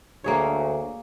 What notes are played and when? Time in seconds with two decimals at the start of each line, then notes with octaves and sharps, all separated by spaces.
0.24 D2 A#3 G#4 C#5